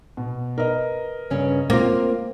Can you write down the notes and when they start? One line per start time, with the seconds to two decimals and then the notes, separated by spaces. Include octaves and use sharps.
0.17 B2
0.58 A#4 B4 D#5
1.30 G2 C#3 C#4
1.70 A#3 C4 F4 D6